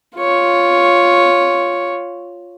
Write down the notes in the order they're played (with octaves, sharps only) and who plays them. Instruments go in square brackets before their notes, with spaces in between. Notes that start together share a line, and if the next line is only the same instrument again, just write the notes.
[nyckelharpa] F4 C#5